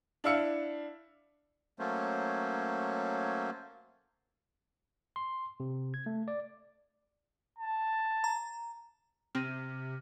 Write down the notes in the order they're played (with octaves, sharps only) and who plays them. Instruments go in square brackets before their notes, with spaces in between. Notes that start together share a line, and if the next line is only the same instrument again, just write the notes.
[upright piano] D4 E4 F5 E6 C#7
[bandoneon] F#3 A3 A#3 C#4 C5
[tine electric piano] C6
C3
G#6
A3
D5
[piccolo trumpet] A5
[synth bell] A#5
[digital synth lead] C3 [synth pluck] C4 [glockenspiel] F6 A#6 D#7